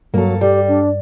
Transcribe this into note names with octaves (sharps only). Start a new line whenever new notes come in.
G2 F#3 A#3 A4
G3 G4
D4